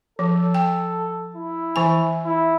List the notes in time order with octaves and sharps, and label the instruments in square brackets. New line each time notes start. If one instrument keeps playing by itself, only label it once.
[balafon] F3 [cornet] A4
[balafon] G5
[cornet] E4
[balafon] E3 G#5
[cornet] E4